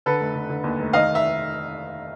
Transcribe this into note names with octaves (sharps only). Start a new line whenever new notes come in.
D3 A4 B4
F1
D3
D3
D#2
F1
D#3 D#5 F5
E5